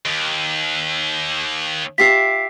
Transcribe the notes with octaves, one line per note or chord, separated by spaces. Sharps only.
D#2
F4 G4 E5 B6 C7